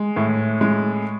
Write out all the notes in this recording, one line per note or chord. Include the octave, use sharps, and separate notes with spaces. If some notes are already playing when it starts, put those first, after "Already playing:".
Already playing: G#3
A2
G#3